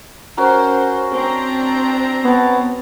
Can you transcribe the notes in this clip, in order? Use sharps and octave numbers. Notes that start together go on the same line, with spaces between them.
C#4 F#4 A#4 C5
C4 D4 A#5
B3 C#5 A5